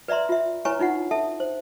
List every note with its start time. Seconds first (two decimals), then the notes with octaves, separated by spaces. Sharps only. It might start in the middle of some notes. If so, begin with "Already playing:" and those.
0.08 B4 D5 E5 A#5 C6
0.29 F4 E5
0.65 E4 B4 C#5 G#5 A#5 C#6
0.79 D4 D#4 F4 F#5
1.11 A4 E5 A5
1.40 C5